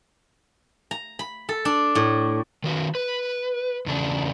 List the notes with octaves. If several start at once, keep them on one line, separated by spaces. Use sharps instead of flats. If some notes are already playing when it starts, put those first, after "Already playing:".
A#5
B5
A4
D4
A2
D#3 F#4 B4
B4
E2 C#3 D4